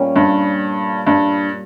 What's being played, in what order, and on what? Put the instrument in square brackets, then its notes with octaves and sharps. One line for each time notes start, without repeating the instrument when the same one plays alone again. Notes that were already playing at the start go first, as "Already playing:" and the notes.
Already playing: [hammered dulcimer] A#2 G3 C#4
[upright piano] G2
G2